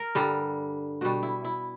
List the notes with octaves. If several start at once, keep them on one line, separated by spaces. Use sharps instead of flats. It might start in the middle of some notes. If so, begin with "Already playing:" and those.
Already playing: A#4
G2 D3 G3
B2 G3 F#4
E4
E4